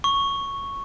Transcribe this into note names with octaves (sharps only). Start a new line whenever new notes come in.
C#6